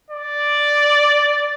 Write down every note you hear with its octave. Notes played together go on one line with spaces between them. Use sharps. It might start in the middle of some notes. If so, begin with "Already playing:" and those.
D5